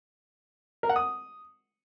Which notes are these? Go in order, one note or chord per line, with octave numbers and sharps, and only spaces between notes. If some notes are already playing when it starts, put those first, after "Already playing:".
A#4
F#5
D#6